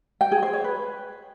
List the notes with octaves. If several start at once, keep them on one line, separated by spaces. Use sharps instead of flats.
G5
G#4
C5
C#5
B4